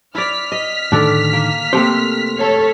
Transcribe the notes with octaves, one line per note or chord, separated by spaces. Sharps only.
E4 D5 F6 B6
D#5
A2 D3 D#3 D4 A4
A#3
C3 A3 A#3 C4 C5
A4 C#5